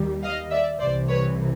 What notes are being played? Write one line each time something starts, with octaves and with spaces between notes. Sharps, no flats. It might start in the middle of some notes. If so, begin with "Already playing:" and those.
Already playing: D#2 D#3 G3
D#5 F5
D5 E5
C2 C3 E3 C5 D5
B4 C#5